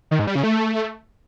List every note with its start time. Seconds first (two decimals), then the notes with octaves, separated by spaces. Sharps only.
0.11 D#3
0.19 G#2
0.27 G3
0.35 C#3
0.44 A3